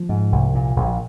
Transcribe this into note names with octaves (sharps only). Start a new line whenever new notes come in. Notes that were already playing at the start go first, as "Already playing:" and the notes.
Already playing: F3
G#2
C2
A#2
A#1